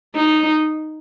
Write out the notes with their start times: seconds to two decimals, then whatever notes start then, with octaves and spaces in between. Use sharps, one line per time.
0.15 D#4